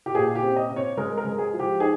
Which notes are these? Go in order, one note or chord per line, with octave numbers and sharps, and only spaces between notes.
G4
A#2 G#4
G4
C4
D#5
C4
C#5
G#3 A#4
A#4
G#3
G#4
F3
G4
D#4 G#4